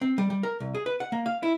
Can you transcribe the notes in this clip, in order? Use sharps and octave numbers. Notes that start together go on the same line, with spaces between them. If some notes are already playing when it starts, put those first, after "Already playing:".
C4
G3
G3
A#4
C2
G#4
B4
F#5
A#3
F5
E4